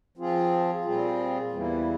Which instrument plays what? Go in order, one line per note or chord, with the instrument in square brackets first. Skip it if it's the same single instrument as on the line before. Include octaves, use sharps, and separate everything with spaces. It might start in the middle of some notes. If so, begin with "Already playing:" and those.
[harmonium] F3 C4 F4 G#4
A#2 G3 C4 F4 G#4
E2 E3 G3 A#3 E4